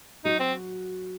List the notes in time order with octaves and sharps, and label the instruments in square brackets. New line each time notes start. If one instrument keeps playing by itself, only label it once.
[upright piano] F#3 F#4 [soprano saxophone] D#4
[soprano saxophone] C4